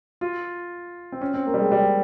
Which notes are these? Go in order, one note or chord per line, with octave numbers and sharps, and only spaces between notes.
F4
C4
C#4
C4
A#3
G3
G#3
G3